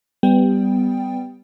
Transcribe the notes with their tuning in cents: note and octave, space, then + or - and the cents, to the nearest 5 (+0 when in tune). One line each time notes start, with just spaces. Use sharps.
G3 +0 B3 +20 G5 +10